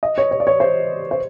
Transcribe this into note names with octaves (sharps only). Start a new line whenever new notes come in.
D#5
C#5
C#5
D5
C#5
C5
C5